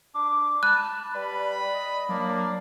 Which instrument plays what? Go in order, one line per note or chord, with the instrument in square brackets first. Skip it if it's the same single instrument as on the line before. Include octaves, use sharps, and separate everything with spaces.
[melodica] D4 [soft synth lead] D6
[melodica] A5 [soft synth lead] B5 [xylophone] F#6
[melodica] G3 B4 [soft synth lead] D5 [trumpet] B5
[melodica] D#5
[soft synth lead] F#3 [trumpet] A#3 [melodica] D4 D5